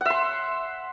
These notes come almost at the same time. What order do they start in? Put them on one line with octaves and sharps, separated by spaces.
F#5 E5 C6